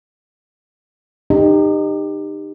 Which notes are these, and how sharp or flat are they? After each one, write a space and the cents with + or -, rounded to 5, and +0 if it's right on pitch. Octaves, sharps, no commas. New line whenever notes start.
D#4 -25 G4 +20